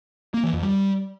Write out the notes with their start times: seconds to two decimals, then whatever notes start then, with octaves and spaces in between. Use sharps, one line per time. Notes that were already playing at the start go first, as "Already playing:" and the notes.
0.34 A#3
0.43 E3
0.53 F2
0.63 G3